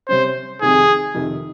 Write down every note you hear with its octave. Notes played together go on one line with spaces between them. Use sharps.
C3 G3 C#4 C5
F2 C3 D#3 G#4
F2 C3 D#3